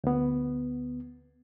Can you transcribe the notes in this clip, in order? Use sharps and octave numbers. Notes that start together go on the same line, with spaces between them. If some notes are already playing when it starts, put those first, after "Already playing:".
D2 B3